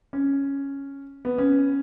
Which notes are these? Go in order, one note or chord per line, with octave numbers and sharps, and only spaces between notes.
C#4
B3
C#4